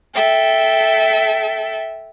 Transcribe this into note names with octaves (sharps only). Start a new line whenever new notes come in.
A4 E5 G5